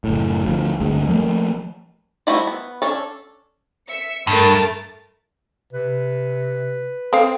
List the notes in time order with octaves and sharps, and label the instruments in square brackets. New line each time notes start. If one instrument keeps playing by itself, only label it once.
[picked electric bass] F#1 A2
D2 F3
G1 D2 G#3
F3 A3 A#3
[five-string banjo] F3 G3 A3 E4 F#4
B3
C#4 D4 A4
[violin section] E5 C#7
[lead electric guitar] G2 [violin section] A3 A#4 A6
[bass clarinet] C3 [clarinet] B4
[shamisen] C4 F5 [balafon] A4